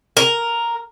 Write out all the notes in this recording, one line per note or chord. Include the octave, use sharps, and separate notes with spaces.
A#4